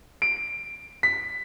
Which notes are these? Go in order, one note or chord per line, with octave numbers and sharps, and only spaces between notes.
D7
B6